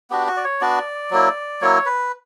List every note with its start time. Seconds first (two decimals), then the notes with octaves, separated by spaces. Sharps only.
0.10 B3 D4 F#4 G4
0.27 F#4
0.37 D5
0.44 C#5
0.61 B3 D4 F#4 D5
1.11 F#3 A#3 E4
1.61 F#3 A#3 E4 C#5
1.86 B4